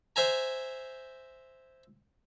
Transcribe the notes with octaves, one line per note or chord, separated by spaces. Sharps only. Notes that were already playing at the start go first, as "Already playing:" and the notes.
C5 E5 G#5 A#5